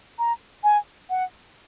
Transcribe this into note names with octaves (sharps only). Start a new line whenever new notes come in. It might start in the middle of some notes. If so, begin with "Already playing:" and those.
A#5
G#5
F#5